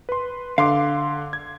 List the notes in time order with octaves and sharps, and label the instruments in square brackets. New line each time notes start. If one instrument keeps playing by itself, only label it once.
[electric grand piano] B4 C6
[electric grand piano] D3 C6 D6 [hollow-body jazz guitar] F5
[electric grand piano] G#6